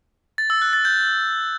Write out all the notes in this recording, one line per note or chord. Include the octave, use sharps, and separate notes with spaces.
A6
E6
F#6
A6
G6